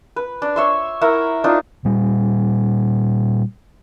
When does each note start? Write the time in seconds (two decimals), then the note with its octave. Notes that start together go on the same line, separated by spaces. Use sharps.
0.16 B4
0.42 D4
0.56 C#5 E5 C6
1.01 E4 A#4 E5 F#5
1.44 D4 D#4 F4
1.85 A#2 G3